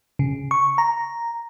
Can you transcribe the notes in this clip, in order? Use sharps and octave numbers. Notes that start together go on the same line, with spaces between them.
C#3
C#6
A#5